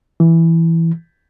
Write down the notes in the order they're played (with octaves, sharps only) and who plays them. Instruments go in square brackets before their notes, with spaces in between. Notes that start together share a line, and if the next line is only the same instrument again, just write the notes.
[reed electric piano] E3